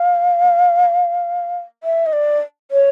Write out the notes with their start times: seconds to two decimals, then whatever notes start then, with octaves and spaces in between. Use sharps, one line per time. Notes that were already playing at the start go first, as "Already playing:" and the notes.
Already playing: F5
1.83 E5
2.06 D#5
2.13 D5
2.71 C#5